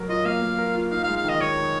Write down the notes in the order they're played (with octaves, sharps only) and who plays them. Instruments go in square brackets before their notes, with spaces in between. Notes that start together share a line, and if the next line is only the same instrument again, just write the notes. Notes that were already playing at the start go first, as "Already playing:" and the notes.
Already playing: [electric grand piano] F#3 A#4
[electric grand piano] F4 [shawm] D#5
[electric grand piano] A#3 [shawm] F5
[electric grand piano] A#3
A#4
F4
[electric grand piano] D#4 [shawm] F5
[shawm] F5
[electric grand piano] G#3
[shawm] F5
[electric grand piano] D#3 [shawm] D#5
[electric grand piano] D#3 [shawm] C#5
[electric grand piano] D#4